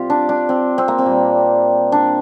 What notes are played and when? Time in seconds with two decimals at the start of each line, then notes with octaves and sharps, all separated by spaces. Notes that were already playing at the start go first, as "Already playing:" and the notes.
Already playing: C3 G3 F4 G4
0.10 D4
0.29 D4
0.49 C4
0.78 C4
0.88 A#3
0.98 C4
1.06 A#2 G3
1.92 D4